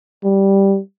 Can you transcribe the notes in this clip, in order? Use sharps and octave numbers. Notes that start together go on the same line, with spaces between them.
G3